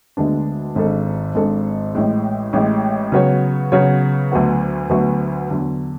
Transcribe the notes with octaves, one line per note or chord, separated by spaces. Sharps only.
D2 D3 G#3 B3 D4
G#1 G#2 G#3 D4 A4
G#1 G#2 G#3 D4 A4
A1 A2 G#3
A1 A2 G#3
C#3 F#3 B3 F#4 C#5
C#3 F#3 B3 F#4 C#5
D2 D3 F#3 B3 F#4
D2 D3 F#3 B3 F#4
E2 D3 F#3